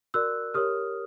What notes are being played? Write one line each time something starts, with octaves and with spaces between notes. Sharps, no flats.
F#4 A#4 D5 E6 F#6
G4 A#4 C#5 D#6 F6